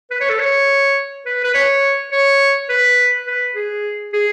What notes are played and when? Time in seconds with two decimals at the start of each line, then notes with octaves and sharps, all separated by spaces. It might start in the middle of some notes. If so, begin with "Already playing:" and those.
0.10 B4
0.20 C#5
0.29 A4
0.39 C#5
1.26 B4
1.44 B4
1.54 C#5
2.12 C#5
2.69 B4
3.27 B4
3.55 G#4
4.13 G#4